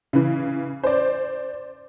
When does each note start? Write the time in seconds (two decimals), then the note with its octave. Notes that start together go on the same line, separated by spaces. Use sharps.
0.13 C#3 E3
0.83 C5 D5